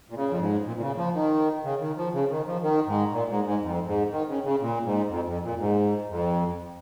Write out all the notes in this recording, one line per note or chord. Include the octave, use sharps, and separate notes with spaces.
A#2
C#3
F2
G#2
A#2
A#2
C#3
F3
D#3
C#3
D#3
F3
C#3
D#3
F3
D#3
G#2
A#2
G#2
G#2
F2
G#2
D#3
C#3
C#3
A#2
G#2
F2
F2
A#2
G#2
F2